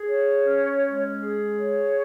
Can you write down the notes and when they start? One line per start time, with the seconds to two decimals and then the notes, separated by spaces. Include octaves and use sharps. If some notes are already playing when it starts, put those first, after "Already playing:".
Already playing: G#4
0.09 C#5
0.46 C#4
0.83 G#3
1.21 G#4
1.59 C#5